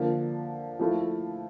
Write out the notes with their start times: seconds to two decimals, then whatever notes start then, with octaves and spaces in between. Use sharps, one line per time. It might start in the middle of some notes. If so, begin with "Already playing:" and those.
Already playing: D3 F3 A#3
0.79 F3 A3 E4 A4